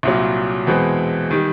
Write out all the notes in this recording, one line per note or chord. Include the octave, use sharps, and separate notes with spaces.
C2 A#2 F#3
E2 B2 G#3 C4
D#3 G3